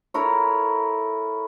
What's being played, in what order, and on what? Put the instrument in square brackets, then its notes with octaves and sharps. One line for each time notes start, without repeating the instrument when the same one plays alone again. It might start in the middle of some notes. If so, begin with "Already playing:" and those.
[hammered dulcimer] E4 A4 A#4 C#5